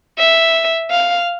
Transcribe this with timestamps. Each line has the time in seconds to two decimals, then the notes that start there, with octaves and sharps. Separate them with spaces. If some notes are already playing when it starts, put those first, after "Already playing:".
0.18 E5
0.91 F5